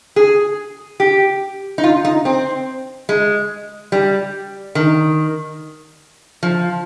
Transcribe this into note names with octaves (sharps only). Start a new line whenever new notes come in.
G#4
G4
D#4
F4
D#4
C4
G#3
G3
D#3
F3